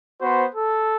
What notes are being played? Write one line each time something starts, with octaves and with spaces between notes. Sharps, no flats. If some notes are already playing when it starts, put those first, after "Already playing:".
B3 F#4 C5
A4